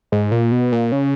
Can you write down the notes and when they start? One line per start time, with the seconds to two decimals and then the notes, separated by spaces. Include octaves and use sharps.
0.12 G#2
0.32 A#2
0.52 B2
0.72 A#2
0.92 C#3